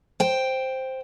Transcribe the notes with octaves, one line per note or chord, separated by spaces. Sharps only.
C5 G5